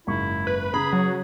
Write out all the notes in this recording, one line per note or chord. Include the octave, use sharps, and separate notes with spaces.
F#1 G#2 E4 C#6
B4
C#3 G#4 A#5 B5
F#3